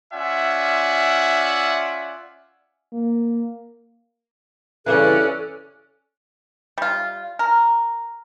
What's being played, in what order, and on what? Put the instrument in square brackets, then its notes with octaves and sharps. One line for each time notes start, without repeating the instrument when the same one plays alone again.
[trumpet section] C#4 F4 D5 E5 F#5 G#5
[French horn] A#3
[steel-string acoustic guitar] G2 C#3 E3 [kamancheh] C#4 D5 [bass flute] A4 [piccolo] F#6
[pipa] G3 F4
A#4